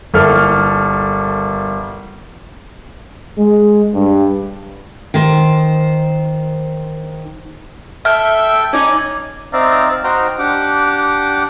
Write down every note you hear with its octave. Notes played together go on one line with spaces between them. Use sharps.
G1 A#3 E4 A4 F6
G#3
G2
D#3 C5
A4 E5 G5 F6
C#4 D#4 D5 G#5
C4 D#4 D5 E5 F5 A#5
D#4 F#4 C5 G5 A#5 F6
D4 G4 F#5 D6